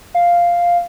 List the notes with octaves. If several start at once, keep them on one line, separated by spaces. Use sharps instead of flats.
F5